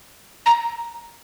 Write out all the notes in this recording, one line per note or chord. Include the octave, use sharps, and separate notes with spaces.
A#5